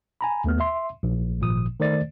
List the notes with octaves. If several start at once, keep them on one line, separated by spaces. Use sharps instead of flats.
G#5 A#5 B5
D#2 A3 B3 F6
E5 C6
A#1
G#1 A#2 F3 D#6
D#3 A3 C5 D5 A6